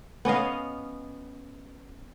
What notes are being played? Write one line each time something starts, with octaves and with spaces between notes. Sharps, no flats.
B3 C#4 D#5 F5